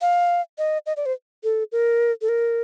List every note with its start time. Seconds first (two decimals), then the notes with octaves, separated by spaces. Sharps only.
0.02 F5
0.58 D#5
0.86 D#5
0.97 D5
1.06 C5
1.44 A4
1.72 A#4
2.22 A4
2.29 A#4